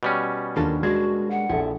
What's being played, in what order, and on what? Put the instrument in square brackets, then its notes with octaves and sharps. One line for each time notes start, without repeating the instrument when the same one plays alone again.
[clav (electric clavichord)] B2 G3 C#4
[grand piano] D#2 [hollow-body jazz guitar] A#3 F4 A4 [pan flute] D4
[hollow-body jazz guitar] G#3 A#3 D4 [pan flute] F#4 [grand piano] G#6
[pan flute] F#5
[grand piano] A#1 A4 [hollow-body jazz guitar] F3 E4